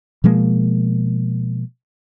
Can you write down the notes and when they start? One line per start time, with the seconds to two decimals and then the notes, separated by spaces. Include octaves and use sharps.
0.24 B2 F3 G#3 A#3